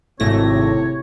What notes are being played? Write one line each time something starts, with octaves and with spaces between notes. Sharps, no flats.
G#1 A2 C3 A3 C#5 A#6